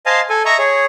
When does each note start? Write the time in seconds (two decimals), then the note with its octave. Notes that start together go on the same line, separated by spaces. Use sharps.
0.06 C5 D#5 F5 G#5 A5
0.29 A4 G#5
0.45 D#5 E5 A#5 C#6
0.59 G#4 C#5